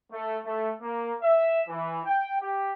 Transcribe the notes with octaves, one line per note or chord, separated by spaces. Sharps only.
A3
A3
A#3
E5
E3
G5
G4